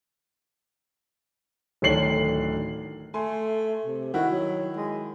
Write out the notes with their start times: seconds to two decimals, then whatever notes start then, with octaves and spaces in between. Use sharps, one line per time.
1.82 D1 D3 D#3 C#5 C7 F#7
3.14 A3 G#5 C6
3.85 C3
4.14 D#3 E4 F#4
4.32 F#3
4.76 G#3